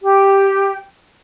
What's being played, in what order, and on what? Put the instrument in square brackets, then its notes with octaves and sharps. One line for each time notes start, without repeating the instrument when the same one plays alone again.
[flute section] G4